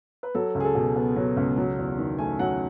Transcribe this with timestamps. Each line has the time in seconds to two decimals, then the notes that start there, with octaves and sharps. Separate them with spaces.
0.23 B4
0.35 F#3 A4
0.55 C#2
0.60 G#4
0.65 A4
0.75 B2
0.96 B3
1.16 F#3
1.37 C#2
1.57 F#3
1.78 E2
1.98 D#3
2.18 A3 G#5
2.39 F#3 F#5